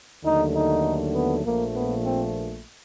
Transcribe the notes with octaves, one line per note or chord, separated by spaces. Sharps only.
D#2 D3 F#3 A3 D#4
D#4
B3
A#1 A#2 F3 A3 A#3
B3
C4